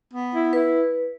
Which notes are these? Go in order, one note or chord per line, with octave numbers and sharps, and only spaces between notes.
B3
E4
E4 B4